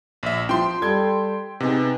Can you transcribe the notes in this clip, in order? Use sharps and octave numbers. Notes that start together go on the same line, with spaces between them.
A#1 E5
F3 G5 C6
G3 A4 G#6
C3 B3 D#4 G#4